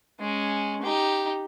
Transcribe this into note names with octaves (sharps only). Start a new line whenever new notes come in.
G#3 C#4
D#4 G4